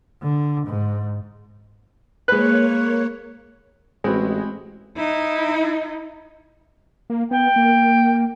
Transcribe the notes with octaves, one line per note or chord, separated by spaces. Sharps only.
D3
G#2
G#3 A#3 B4 C#5 F#6
A1 G#3 C4 F#4 B4
D#4 E4
A#3
B3 G5
A#3